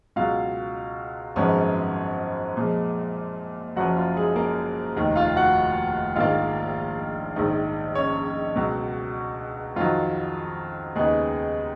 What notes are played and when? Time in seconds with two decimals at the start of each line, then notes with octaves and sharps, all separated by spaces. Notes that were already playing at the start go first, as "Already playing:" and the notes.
0.16 C#2 B2 F#3 F4 F5
1.36 G#1 F#2 F3 G#3 B3 C#4 C#5
2.57 A#2 F3 G#3
3.76 F#1 F#2 F3 F#4
3.97 F4
4.16 G#3 G#4
4.36 A#3 A#4
4.96 F1 D#2 D#3
5.16 F4 F5
5.27 F5
5.36 F#4 F#5
6.16 A#1 G#2 D#3 A#3 F4 F5
7.36 A#1 G#2 D#3 D#4 D#5
7.95 C#4 C#5
8.56 C#2 B2 F#3
9.76 F2 D#3 F#3 F4
10.95 D#2 C#3 G#3 B3 D#4 G#4